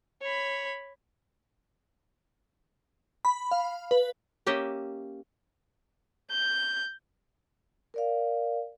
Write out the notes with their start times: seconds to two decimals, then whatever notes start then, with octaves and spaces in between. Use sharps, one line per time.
0.22 C#5 B5
3.25 B5
3.51 F5
3.91 B4
4.47 A#3 C#4 G4 D#5 E5
6.32 G6
7.94 A#4 D5 F5